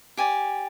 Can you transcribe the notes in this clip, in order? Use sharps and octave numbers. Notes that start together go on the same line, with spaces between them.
G4 D5 G#5